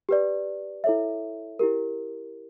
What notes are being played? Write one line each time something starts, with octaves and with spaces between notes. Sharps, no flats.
G4 B4 D5
E4 A4 C#5 E5
E4 G4 A#4